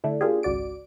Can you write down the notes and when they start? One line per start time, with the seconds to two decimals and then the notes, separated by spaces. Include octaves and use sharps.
0.04 D3 A3 D4 E4
0.21 A#3 D4 F4 G4 G#4
0.43 G#1 C#2 F#4 D5 D7